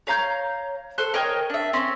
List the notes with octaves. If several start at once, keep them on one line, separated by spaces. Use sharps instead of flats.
C#5 F5 A#5 G6
A4 C5 F#6
A#4 C#5 D#5 G5
D4 E5
C4 C#4 C6